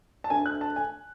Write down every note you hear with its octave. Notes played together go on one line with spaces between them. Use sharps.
A5
D2 D3 A3 G#5
F#6
A5
G#5